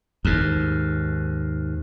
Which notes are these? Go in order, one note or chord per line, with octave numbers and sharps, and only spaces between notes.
D#2 G#2